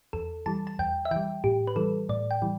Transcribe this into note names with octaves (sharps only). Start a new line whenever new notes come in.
E2 A4
E3 G3 A5
A5
E2 G5
E5
E3 G3 G5
A2 G4
B4
E3 G3 A4
A2 D5
G5
E3 G3